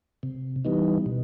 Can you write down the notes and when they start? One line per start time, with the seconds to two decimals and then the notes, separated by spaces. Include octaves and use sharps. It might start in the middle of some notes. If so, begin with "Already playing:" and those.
0.23 C3
0.65 E3 G3 B3 D#4
1.06 B2